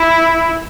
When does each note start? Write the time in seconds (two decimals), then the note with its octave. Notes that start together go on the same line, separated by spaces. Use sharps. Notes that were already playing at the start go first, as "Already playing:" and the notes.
Already playing: E4